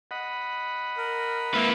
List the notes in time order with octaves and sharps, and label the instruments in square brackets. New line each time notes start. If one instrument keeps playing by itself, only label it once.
[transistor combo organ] D#5 F#5 B5
[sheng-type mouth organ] A#4
[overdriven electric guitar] A#3 B4 [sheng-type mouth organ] E4 E5